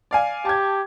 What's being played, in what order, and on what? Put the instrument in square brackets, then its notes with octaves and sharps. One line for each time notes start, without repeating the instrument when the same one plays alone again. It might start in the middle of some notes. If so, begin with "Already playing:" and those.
[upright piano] D5 F5 G#5
[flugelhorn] G4 [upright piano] A5 G#6